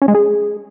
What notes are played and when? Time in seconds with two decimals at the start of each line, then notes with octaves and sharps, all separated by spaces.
0.02 C#4
0.08 G#3
0.15 G#4